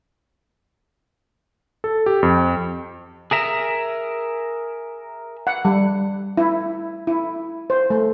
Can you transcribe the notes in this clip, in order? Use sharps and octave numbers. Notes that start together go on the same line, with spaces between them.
A4
G4
F2
G#4 A#4 E5 A#5
F#5
G3
E4
E4
C5
A3